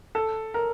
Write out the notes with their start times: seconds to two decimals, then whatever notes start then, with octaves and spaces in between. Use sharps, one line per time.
0.15 A4
0.54 A#4